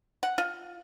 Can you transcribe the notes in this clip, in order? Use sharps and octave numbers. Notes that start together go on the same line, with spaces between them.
F#5
F4